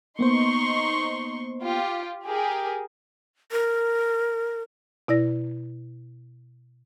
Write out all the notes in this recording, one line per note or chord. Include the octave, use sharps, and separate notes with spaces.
A#3 B3 D#4 C5 C6 C#6
F4 G4
G4 G#4 A#4
A#4
B2 E4 D5 A#6